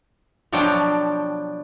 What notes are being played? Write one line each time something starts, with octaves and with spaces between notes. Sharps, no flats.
B2 F3 F#3 D4 G5